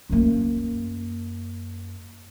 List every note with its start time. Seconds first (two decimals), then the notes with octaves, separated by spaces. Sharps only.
0.09 F#2 A#3